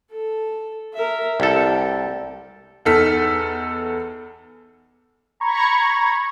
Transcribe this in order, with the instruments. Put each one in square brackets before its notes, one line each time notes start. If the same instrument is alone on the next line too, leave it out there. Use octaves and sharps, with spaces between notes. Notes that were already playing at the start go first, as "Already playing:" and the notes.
[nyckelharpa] A4
A#4 E5
[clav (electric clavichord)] C2 A4 [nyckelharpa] G4
[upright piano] E2 D#4 A4 F6 B6
[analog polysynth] A#5 B5 C#6 G#6